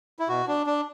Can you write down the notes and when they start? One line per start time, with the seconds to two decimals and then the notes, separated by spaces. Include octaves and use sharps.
0.19 E4
0.28 B2 F#4
0.48 D4
0.66 D4